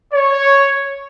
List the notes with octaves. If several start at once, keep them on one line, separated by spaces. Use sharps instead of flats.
C#5